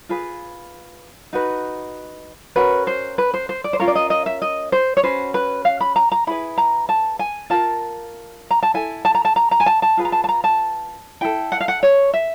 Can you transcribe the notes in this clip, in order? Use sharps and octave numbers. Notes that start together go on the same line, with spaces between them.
F4 G#4 B4
D#4 F#4 B4
C#4 F#4 A#4 B4
C5
B4
C5
C5
D5
C5
C#4 F4 A#4 C#5
D5
D#5
D#5
E5
D#5
C5
C#5
C#4 F#4 B4 C5
B4
F5
B5
A#5
A#5
E4 G#4 B4 B5
A#5
A5
G#5
F4 A#4 A5
A#5
A5
E4 A4 G#5
A5
A#5
A5
A#5
A#5
G#5
A5
A5
F4 G#4 B4
A#5
A5
A5
A#5
A5
E4 A4 G5
F#5
F5
F#5
C#5
E5